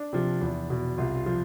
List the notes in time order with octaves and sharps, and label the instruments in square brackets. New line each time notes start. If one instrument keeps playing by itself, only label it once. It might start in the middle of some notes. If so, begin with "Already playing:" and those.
Already playing: [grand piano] D4
C3 F3
E2
B2
C2 F4
F4
F3